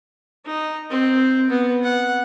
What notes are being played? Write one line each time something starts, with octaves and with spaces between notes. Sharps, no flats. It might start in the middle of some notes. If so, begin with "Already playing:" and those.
D#4
C4
B3
F#5